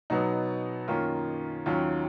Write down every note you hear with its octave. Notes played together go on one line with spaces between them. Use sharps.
B2 F#3 B3 D#4
F#2 D#3 A#3 C#4 F4
D#2 D#3 F#3 C#4 F4